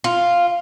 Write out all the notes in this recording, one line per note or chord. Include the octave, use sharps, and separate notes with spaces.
F4